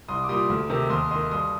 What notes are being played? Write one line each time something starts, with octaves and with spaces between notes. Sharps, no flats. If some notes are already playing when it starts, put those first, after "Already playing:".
C2 C6 D#6
D6
A#2 G3 C6 D#6
D2
C3 D#3
D#2 C6 D#6
D#3 G#3 C6 D#6
G2 C6 D#6